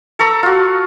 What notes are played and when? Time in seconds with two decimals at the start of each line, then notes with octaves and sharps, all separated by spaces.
0.19 A4 A#5 C#6 E6
0.43 F4 F#4